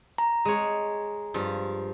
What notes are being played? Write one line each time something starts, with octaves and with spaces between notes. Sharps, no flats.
A#5
G#3 C#5
G2 F3